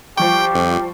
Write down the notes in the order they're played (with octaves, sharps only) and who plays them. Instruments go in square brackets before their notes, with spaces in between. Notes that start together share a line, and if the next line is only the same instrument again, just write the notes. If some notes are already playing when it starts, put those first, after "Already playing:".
[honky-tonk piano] F3 G3 C#6 [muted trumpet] G4 [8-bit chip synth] G5
[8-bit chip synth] F2